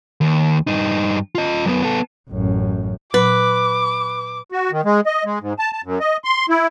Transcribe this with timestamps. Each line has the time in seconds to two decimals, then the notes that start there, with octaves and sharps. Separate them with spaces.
0.21 D#2
0.67 G2 D#4
1.35 F4 D#5
1.66 F#2 B3
1.83 B3 A4
2.30 A1 F#2
3.14 A#2 F#3 B4 D6
4.52 F#4
4.71 D#3
4.85 G#3
5.06 D#5
5.25 G#3
5.41 G#2
5.59 A5
5.73 A5
5.84 F#2
6.00 D#5
6.24 C6
6.49 E4